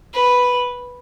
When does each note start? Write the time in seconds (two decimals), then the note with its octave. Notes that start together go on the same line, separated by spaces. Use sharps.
0.13 B4